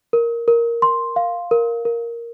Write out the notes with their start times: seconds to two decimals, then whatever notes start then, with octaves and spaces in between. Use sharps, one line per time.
0.13 A#4
0.48 A#4
0.82 C6
1.16 F5
1.51 A#4
1.85 A#4